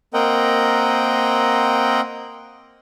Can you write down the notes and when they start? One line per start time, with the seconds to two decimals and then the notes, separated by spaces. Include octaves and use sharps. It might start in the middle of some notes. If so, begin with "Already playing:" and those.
0.14 A#3 C4 A#4 D#5 F#5 G5